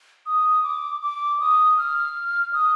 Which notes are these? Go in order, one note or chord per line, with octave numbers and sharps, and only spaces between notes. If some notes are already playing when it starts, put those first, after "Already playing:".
D#6
D6
D6
D#6
F6
D#6